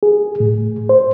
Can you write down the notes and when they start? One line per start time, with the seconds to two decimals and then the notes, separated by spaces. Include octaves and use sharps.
0.03 G#4
0.40 A2
0.89 C5